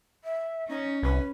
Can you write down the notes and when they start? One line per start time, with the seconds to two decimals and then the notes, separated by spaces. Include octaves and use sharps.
0.24 E5
0.69 C#4 D#4
1.02 C2 B4